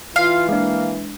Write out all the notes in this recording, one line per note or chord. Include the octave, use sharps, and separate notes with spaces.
E3 F4 F5
G#3 A#3 D4